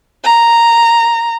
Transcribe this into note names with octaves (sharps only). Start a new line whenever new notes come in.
A#5